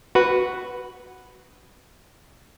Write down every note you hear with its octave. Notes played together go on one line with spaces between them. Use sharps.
F#4 B4